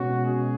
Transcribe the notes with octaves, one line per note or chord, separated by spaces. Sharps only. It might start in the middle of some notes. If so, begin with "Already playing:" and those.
Already playing: B2 G#3 C#4 F#4
G#4